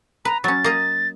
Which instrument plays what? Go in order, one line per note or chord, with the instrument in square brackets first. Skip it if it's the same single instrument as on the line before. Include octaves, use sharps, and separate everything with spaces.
[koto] B4 [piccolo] A#5
[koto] F#3 C#4 [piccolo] A6
[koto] A#3 D#5 A#5